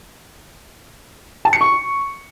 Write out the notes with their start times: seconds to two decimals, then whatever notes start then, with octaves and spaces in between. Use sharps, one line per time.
1.45 A5
1.53 C#7
1.61 C#6